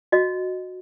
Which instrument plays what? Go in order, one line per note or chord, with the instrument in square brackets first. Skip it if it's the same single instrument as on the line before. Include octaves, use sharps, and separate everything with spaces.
[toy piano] F#4 D#5